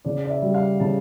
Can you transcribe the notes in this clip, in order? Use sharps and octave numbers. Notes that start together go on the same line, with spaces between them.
C#3 D5
D5
E5
G3
F5
C#3 A5